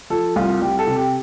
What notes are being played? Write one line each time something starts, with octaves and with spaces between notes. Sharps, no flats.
F3 A4
C2 F4
C2 G4
A4
C3
G4